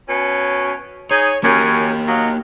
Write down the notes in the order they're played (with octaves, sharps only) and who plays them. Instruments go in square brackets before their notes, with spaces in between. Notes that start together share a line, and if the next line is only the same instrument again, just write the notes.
[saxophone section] B2 C#4
[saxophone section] D#4 G#4 [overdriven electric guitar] C#5
[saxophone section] F#2 C#4 [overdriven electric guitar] A#3 G4
[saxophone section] F#3 D#5 F5